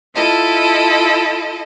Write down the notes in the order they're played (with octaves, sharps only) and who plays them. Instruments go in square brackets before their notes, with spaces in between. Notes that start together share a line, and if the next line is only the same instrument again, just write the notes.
[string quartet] E4 F4 A4 D#5